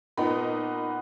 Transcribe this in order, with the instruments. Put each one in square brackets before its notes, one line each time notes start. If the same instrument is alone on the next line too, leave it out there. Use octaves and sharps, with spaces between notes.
[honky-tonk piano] A#2 D#4 [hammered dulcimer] B3